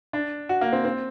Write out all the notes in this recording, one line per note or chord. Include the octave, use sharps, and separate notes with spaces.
D4
F#4
A#3
C4
C4